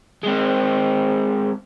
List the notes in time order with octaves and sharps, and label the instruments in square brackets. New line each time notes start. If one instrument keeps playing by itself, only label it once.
[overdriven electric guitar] G#3 C4